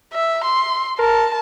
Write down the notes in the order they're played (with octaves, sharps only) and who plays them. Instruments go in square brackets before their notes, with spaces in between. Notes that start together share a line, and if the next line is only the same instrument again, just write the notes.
[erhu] E5
C6
[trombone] A#4 [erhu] A5